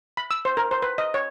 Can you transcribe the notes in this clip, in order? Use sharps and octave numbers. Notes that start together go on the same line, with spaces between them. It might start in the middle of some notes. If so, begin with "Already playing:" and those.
B5
E6
C5
A#4
C5
B4
D#5
C#5